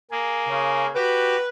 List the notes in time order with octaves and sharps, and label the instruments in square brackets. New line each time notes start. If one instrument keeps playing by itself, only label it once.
[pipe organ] A#3 G#4
[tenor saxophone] C#3
[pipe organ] F#4 G4 D6 [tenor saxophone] B4